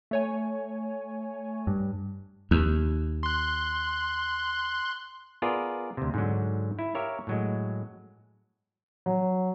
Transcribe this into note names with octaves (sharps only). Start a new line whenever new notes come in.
A3 C#5 G#5
G2
D#2
C6 F#6
B3 F4 G#4 A#4 D5
D2 C3
G#2 D3 F#3
E4
G4 A#4 C#5 E5 F5
A2 F#3 G#3
F#3